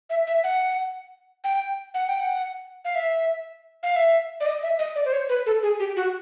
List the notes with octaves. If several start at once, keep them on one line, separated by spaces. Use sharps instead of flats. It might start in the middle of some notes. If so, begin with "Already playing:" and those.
E5
E5
F#5
G5
F#5
G5
F#5
F5
E5
F5
E5
D5
D#5
E5
D#5
D5
C5
C#5
B4
A4
G#4
G4
F#4